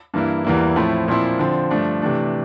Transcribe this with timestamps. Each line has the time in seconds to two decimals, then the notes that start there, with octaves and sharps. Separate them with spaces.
0.14 G2 E3 A#3 E4
0.44 E2 E3 G3 A#3 E4
0.76 A2 F3 A3 C4 E4
1.08 A#2 F3 C4 E4
1.39 D3 F3 C4
1.71 G2 F3 A3 D4
2.02 C3 E3 A3 D4